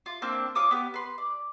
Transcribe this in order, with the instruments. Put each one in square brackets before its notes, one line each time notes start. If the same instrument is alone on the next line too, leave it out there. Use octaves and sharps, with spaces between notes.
[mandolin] F4
A#3 C4 D4
F4 C#5 D6 D#6
B3 G4
B4 C6
D5